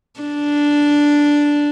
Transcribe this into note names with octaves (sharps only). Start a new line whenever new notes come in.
D4